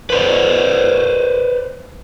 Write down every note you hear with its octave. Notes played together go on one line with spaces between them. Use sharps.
B4 C5 D5